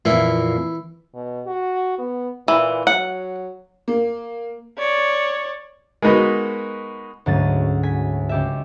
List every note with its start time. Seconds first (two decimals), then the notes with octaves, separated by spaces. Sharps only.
0.05 F2 A#2 E3 E4
1.15 B2
1.47 F#4
1.99 B3
2.48 A#2 E3
2.87 F#3 F#5
3.88 A#3
4.78 C#5 D5
6.02 G#3 A#3 B3 D#4 F#4 B4
7.26 D2 G#2 F#3 C#4 A6 D#7
7.83 G#5 B6
8.29 C#2 G4 E5